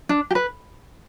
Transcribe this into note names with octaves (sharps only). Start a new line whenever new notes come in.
D4
G4
B4